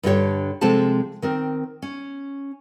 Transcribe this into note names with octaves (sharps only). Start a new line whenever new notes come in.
G2 D3 D4 G4 C#5
C3 F3 G#3 C4 A4 A5
D#3 C4 A#4
C#4